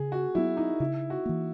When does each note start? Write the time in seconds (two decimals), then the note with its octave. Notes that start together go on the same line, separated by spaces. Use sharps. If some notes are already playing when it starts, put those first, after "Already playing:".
Already playing: C#3 G#4
0.12 F#4
0.35 F#3 B3 E4
0.57 D#4
0.80 C#3 E4
1.10 F#4
1.26 E3 A#3